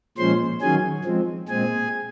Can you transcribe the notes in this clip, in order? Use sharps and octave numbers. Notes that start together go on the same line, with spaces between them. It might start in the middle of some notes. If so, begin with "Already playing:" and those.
A#2 F3 G#3 C#4 C5 C6
D#3 F#3 C#4 G#4 G#5
F3 G#3 C4
A#2 G#3 C4 G#4 G#5